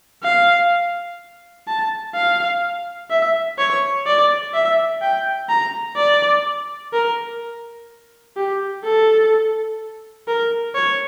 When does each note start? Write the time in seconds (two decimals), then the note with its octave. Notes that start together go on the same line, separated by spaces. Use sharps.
0.24 F5
1.68 A5
2.15 F5
3.11 E5
3.59 C#5
4.07 D5
4.54 E5
5.02 G5
5.50 A#5
5.97 D5
6.93 A#4
8.37 G4
8.84 A4
10.28 A#4
10.76 C#5